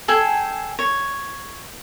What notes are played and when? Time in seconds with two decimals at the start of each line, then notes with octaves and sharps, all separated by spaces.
0.08 G#4 A4 G5 G#5
0.79 C#5